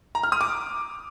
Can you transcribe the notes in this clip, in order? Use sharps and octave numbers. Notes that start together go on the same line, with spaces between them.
A#5
F6
D#6
D6